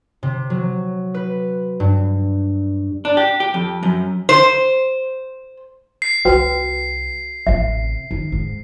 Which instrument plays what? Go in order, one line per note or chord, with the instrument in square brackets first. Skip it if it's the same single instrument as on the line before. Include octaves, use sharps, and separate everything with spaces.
[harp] C3
F#3
B4
G2
[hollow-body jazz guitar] D4
G4
G4
F2
F#2
[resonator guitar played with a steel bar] C5
[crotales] C7
[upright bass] C2 [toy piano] F#4 B4 G5
[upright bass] A1 C3 [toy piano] E5
[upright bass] D#3
G#2